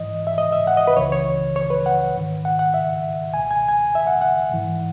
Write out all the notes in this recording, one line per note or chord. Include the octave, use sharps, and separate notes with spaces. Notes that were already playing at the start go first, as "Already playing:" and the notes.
Already playing: G#2 E3 D#5
E5
D#5
E5
F#5
D#5
B4
C#2 C#3 E3 C#5
C#5
C#5
B4
F#5
G#2 D#3
F#5
F#5
E5
C#2 B2 G#5
G#5
G#5
E5
F#5
F#5
G#2 E3